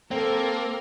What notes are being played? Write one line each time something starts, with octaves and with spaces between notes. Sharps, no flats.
A#3 C4 A4 A#4